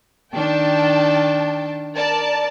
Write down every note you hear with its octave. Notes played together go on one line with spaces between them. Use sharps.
D#3 D4 G5 A5
A#4 D5 A5